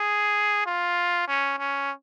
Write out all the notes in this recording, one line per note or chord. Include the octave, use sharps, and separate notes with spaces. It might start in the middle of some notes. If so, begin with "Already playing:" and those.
Already playing: G#4
F4
C#4
C#4